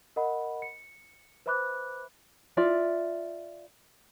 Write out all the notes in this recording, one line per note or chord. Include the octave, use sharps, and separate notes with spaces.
A#4 D#5 F#5 B5
C#7
B4 C5 E5 B5 D6 F#6
F4 D5 E5